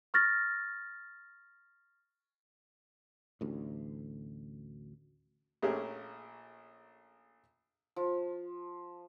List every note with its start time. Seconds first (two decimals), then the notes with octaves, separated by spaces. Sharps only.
0.14 C#6 F6 A6 A#6
3.41 A1 D2
5.62 A#1 A3 C#4 G4 G#4 A#4
7.96 F3